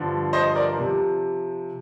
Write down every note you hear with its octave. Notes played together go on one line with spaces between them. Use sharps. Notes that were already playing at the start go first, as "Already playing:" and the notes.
Already playing: G2 D3 F3
C5 D#5
A#4 D5
C3 F3